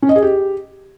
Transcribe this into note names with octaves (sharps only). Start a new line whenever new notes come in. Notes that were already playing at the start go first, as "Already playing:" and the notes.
C#4
D#5
G#4
G4